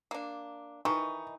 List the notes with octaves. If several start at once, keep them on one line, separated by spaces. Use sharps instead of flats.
A#3 D4
D#3 E3 D#4 C#6